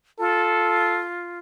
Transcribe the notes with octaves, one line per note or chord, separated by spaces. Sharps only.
F4 A4